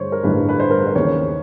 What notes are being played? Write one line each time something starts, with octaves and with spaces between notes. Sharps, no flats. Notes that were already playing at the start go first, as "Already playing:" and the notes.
Already playing: G2 D3 C5 C#5
A#4
A1 G2 D3 G3 B4
B4
C5
A#4
B4
C5
D#2 C#3 E3 C#5